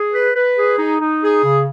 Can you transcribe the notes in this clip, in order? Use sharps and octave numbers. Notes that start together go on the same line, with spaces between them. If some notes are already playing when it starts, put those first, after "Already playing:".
Already playing: G#4
B4
B4
G#4
D#4
D#4
G#4
C#3